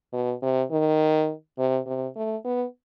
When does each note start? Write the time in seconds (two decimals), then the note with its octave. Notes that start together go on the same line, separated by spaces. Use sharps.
0.13 B2
0.42 C3
0.71 D#3
1.58 C3
1.87 C3
2.16 A3
2.45 B3